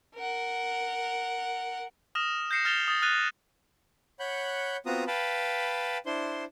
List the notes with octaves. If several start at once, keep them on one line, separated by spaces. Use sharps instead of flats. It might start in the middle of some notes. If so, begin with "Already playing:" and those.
A#4 F#5
D#6 F6 A#6 E7
G6 A#6 C7 C#7 E7
F6 A6 E7 F7 G7
D#6 A6
F6 F#6 A6 D#7 F7
C#5 F#5 B5 F#6 G6
B3 C4 F4 F#4 A#5 D#6
B4 F5 G5 A5 B5
D4 E4 C5 C6